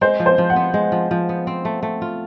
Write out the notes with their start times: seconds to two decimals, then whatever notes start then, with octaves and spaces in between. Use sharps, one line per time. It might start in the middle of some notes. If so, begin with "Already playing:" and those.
0.01 G#3 C5
0.20 F3
0.26 C5
0.38 F3
0.50 F#5
0.56 B3
0.74 G#3
0.92 F3
1.11 F3
1.29 B3
1.47 C4
1.65 A3
1.83 A3
2.02 F4